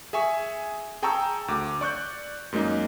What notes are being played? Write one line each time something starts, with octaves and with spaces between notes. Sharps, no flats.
G#4 E5 G#5 C#6
G#4 G5 A5 A#5 C#6 E6
D2 D6
D5 C#6 F#6 G6
F#2 G#3 A#3 D#4